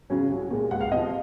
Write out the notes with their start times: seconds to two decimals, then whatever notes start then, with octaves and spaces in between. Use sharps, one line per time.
0.10 C#3 F#3 C#4
0.30 C2
0.51 A#2 G#3
0.71 C#2 F#5
0.81 F5
0.91 C3 D#5
0.96 F3